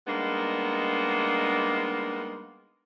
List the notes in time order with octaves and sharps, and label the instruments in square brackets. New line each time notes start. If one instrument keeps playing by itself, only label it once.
[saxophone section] G3 G#3 A#3 B3 D4 D#4